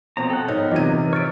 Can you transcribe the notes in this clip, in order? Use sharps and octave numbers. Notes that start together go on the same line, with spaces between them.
B2 F3 C4 A#5
A4 F#5 G5
G#2 B3 D#4 A#4 C#5
A#1 C3 E3 F3 D#4 D#5 G#6 D#7
C#5 E5 F6 A6 D7